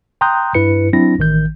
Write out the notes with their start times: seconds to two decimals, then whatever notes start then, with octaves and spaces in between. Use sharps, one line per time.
0.21 G5 A#5 C6 D#6 F#6 G6
0.55 G2 E4 B4 C#7
0.93 F#3 C4 D4 E4 A#6
1.19 A1 D#3 G6